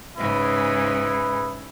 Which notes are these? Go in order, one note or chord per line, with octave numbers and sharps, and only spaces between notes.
G#2 C#3 E4 G#4 B4